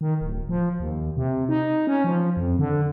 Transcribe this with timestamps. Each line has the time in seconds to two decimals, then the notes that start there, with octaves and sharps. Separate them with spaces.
0.01 D#3
0.21 D1
0.49 F3
0.80 D#2
1.17 C3
1.49 D#4
1.87 C#4
2.04 F3
2.37 F2
2.59 D3